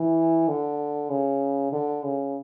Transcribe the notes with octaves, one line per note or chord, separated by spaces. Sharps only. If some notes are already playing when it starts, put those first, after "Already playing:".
Already playing: E3
D3
C#3
D3
C#3